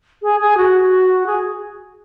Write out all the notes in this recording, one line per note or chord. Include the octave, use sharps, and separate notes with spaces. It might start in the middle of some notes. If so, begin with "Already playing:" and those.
G#4
G#4
F#4
G#4